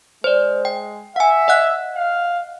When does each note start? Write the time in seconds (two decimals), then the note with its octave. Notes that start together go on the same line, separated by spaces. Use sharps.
0.24 G#3 C5 D5
0.65 G5
1.16 E5 F#5 G#5
1.48 D#5 F#5 F#6
1.96 F5